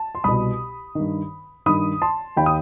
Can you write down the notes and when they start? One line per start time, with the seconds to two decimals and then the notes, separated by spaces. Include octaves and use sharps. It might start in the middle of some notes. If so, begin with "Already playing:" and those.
Already playing: A5
0.15 C6
0.24 C2 B2 B5 D#6
0.95 G2 D#3
1.66 G2 D#3 B5 D#6
2.02 A5 C6
2.37 D#2 D#3 G5 B5
2.46 D#6